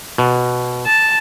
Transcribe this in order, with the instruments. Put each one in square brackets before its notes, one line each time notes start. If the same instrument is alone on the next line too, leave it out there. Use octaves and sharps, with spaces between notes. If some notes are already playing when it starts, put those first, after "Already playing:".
[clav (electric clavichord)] B2
[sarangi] A5